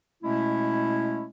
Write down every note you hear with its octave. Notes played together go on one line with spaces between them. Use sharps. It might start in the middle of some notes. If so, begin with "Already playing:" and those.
B2 G#3 A3 C#4 E4